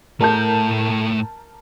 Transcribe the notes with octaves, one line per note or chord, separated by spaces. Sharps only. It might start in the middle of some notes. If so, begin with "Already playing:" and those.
A2 A3 A#4 A5 G6